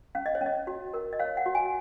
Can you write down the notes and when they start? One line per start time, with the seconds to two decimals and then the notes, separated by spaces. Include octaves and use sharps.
0.15 C#4 F5
0.26 D#5
0.35 C#5
0.41 C#4 D#5
0.67 F#4
0.94 A#4
1.13 D#5
1.19 C#5 F5
1.37 F#5
1.46 F#4
1.55 G#5